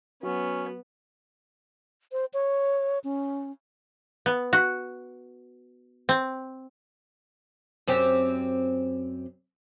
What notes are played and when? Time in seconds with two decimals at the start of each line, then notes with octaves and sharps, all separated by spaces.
0.23 F#3 B3 C#4
2.12 C5
2.34 C#5
3.04 C#4
4.26 B3
4.53 F#4
6.09 C4
7.87 F#2 C4 G4